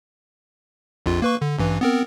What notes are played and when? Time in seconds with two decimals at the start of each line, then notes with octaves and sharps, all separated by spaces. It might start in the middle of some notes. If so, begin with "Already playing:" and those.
1.06 A#1 F2 F4
1.22 A#3 B4 C#6
1.42 D3
1.59 A1 G2 E3
1.81 B3 C4 A#4